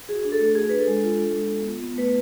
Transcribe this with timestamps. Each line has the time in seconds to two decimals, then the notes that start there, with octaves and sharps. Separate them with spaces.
0.09 F#4 G#4
0.25 D4
0.32 A4
0.40 A3
0.55 F#4 G#4
0.69 D4 B4
0.79 A4
0.87 G#3
1.03 F4
1.18 D4
1.34 G#3
1.51 B3
1.65 F4
1.82 B3
1.97 A3 B4